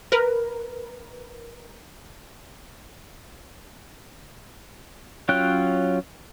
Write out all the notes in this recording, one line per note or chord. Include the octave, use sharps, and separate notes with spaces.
A#4 B4
F#3 C#4 F4 G5 F#6